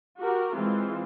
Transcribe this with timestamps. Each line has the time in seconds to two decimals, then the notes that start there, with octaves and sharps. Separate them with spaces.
0.18 F#4 G4 A#4
0.55 E3 G#3 C4 F4